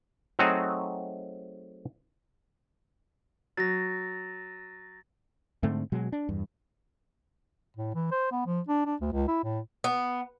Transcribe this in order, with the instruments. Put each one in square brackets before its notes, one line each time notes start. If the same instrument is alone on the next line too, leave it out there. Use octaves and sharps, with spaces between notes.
[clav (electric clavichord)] F#3 A3 C4 D#4 F#4 G#4
[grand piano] F#3 [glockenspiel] A6 A#6
[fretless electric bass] G#2 D3 A3 C4
B2 F#3 G#3
D4
E2 G2
[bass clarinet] A2
E3
C5
B3
F3
D4
D4
D2
C#2
E4
A2
[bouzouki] B3